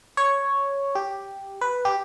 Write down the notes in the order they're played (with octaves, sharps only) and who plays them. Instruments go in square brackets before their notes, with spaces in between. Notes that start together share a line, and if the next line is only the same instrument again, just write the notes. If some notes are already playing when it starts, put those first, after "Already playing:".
[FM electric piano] C#5
G4
B4
G4